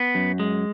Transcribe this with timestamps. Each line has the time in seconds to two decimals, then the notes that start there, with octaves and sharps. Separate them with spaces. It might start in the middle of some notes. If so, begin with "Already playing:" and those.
Already playing: B3
0.15 F#2
0.40 G#3